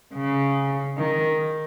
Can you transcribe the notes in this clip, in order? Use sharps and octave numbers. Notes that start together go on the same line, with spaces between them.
C#3
D#3